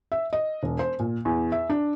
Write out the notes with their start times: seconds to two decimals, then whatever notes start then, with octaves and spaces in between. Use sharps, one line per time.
0.12 E5
0.33 D#5
0.63 E1
0.79 C5
0.99 A#2
1.25 E2
1.52 E5
1.70 D4